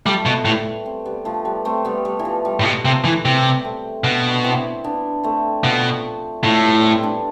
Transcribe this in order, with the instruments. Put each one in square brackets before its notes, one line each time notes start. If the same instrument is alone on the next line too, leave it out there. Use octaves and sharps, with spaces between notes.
[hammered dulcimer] F3 A3 [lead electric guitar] G3
[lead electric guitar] B2
[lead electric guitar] A2 [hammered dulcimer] G3 B3
[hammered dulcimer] A3 C4
G3 B3
F3 A3
G3 B3
A3 C4
G3 B3
G3
E3
F3
G3
[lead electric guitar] A2
B2
[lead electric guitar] C3 [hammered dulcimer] F3 A3
[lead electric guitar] E3
[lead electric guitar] C3 [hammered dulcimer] G3 B3
[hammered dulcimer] A3 C4
[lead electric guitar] B2 [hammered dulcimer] B3 D4
[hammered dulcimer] C4 E4
B3 D4
A3 C4
[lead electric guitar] B2 [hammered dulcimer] F3 A3
[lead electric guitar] A2 [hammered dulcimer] F3 A3
[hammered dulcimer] G3 B3
C4 E4
B3 D4